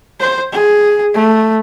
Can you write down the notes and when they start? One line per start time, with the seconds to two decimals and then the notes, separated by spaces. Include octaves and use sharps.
0.20 C5
0.52 G#4
1.14 A3